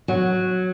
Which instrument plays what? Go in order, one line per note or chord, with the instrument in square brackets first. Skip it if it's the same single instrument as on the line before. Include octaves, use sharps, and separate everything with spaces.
[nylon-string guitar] F#3